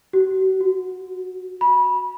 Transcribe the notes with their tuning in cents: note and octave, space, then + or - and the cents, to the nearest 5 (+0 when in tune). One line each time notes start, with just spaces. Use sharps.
F#4 +45
F#4 -10
B5 -25